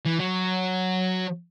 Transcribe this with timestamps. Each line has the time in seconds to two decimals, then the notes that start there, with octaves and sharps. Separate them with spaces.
0.06 E3
0.20 F#3